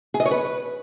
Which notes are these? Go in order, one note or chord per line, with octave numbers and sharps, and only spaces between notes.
G#4
D#5
C#5
B4